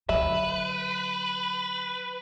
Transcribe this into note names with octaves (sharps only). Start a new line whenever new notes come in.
D3 F#3 B4 E5